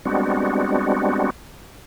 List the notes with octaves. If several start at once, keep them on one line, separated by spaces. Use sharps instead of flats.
G3 G#3 B3 C4 D4 F#4